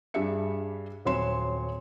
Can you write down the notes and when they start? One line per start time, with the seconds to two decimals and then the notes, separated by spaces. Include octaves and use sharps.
0.14 G2 G3 D4 G#4 E5 C#7
1.05 D#1 F#3 C4 C#5 C6 E7